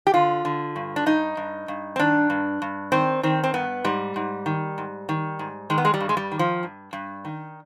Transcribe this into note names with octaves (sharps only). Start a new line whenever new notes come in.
G4
D3 F4
D3
G2
D4
G2 D#4
G2
G2
C4
D#3 D4
G2
G2
D#3 C4
D#3 C4
C4
G2 B3
G#2 G3
G#2
D#3
G#2
D#3
G#2
D#3 G#3
B3
G#3
G3
G2
G#3
G3
D#3
F3
G2
G2
D#3